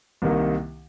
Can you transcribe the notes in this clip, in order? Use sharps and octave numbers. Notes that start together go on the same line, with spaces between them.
C2 C3 D#3 A#3